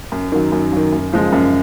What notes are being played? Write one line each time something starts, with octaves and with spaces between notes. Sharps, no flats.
F#2
D#3 F#3
F#2
D#3 F#3
F#2
C#3 F3 G#3
F#2